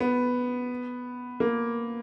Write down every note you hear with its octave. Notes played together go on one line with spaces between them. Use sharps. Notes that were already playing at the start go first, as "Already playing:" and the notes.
B3
A#3